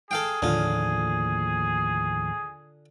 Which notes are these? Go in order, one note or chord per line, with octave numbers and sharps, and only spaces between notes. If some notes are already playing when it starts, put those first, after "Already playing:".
G#4 A4 F5 G5
D#2 A2 D3 F3 F4